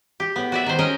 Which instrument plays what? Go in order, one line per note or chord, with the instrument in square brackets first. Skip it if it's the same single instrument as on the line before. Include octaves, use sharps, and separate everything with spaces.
[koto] G4
A2 B3
F#4 D5 E5
D#3 C5
C#4 A#4 D#5 G5